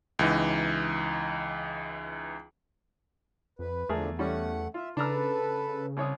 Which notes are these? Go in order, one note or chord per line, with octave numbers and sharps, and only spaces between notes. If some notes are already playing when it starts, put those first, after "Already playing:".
C#2 E3 D#4
F2 B4
E2 D3 F3 A3 D4 G#4 A#4
G3 A3 C#4 F#5
F4 E5
C#3 D4 A4 B4 A#5 E6
C2 C#5 D#6